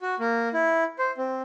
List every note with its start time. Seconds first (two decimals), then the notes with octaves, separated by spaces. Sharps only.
0.02 F#4
0.20 A#3
0.54 E4
0.99 C5
1.18 C4